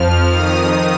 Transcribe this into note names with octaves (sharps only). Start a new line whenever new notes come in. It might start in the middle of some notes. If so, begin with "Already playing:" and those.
Already playing: F2 F3 F6
F2 D#3 D#6